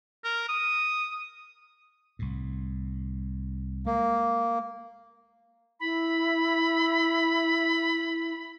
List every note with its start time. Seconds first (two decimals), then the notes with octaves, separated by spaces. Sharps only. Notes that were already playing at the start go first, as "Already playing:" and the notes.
0.24 A#4
0.49 D#6
2.19 C2 A2
3.86 G#3 A#3
5.80 E4 B5